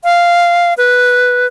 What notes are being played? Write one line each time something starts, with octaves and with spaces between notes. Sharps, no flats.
F5
B4